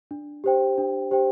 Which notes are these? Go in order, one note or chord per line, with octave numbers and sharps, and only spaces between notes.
D4
G4 C5 G5
D4
G4 C5 G5